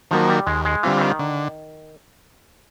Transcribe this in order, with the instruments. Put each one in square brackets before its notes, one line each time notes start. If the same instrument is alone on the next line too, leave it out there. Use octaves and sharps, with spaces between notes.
[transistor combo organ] D#3 F#3 A#3 [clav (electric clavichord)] F3
[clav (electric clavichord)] G3
[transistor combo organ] D#2 [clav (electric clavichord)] G#3
[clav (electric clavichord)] G#3
[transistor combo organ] D3 G3 C4 F4 [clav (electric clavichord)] E3
[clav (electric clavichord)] E3
D#3
[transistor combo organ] D3